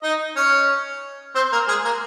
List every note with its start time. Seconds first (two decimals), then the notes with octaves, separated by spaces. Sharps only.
0.03 D#4 D#5
0.36 C#4 C#5
1.35 C4 C5
1.52 A#3 A#4
1.68 G#3 G#4
1.84 A#3 A#4